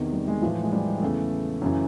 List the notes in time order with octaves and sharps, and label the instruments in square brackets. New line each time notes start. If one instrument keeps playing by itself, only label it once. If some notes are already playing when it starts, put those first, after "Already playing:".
Already playing: [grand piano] E2 C3 D#3
G3
G#3
A2 E3 F3
G#3
G3
G#3
G#3
E2 C#3 E3 A3
F#2 C#3 E3